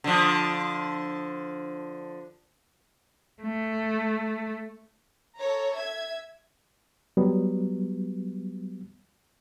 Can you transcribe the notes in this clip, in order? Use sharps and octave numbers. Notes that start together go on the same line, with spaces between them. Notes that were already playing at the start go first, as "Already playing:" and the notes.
D3 F3
A3
A4 C#5 A#5
E5 G#6
F#3 G3 B3